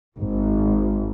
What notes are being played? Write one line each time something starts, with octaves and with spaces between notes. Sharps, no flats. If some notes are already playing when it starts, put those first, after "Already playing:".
G#1